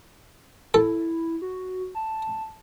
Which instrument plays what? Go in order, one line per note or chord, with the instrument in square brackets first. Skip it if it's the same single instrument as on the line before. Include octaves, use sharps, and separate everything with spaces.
[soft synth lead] E4 [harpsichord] A4
[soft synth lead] F#4
A5